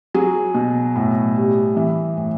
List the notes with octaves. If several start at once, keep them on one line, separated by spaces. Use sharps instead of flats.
F#3 G#4
B2
A2
G3
E3
A2